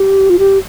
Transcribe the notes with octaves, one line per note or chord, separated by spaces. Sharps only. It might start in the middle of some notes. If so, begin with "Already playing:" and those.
Already playing: G4
F4
G4